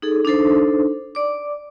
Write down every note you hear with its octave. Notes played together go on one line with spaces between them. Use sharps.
D#4 G#4 A4
D4 D#4 A4 C5
D5 D6